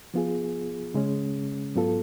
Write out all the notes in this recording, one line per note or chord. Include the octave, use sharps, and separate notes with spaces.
F3 B3 F4 G#4
C#3 G#3 C#4
G#2 F#3 B3 F4 A4